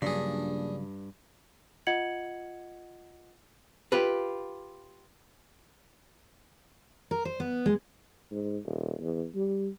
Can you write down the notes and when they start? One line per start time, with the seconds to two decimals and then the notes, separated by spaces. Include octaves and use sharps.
0.02 A#1 G2 C#3 F#3 D4 G#4
1.87 F4 D#5 F#5 G#6 C#7 F#7
3.92 F4 G4 B4
7.11 A#4
7.25 C5
7.40 B3
7.66 G#3
8.31 G#2
8.66 D#1
9.00 E2
9.35 G3